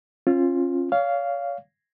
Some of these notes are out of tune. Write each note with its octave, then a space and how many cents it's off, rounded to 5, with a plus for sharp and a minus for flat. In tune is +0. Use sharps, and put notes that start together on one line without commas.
C#4 -35 F4 +0
C#5 +35 F5 -5